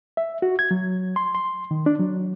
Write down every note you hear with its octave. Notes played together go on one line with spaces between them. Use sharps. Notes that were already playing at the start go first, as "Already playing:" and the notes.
E5
F#4
G#6
F#3
C6
C6
D#3
D4
F#3